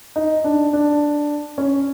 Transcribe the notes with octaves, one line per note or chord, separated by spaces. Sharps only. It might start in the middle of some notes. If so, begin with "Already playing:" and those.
D#4
D4
D4
C#4